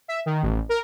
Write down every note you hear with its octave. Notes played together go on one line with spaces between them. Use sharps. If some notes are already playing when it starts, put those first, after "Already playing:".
E5
D#3
A1
A#4